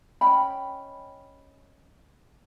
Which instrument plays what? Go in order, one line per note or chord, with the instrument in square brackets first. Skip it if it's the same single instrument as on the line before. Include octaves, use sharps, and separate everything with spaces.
[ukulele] C#4 D#5 G5 B5